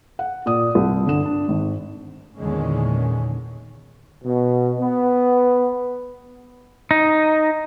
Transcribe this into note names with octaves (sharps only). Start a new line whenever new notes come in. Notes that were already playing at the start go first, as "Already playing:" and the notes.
F#5
A#2 D5 D#6
C2
G1 D3 E7
D4
G#1
E2 A#2 D3 D#3 G#3 C#4
B2
B3
D#4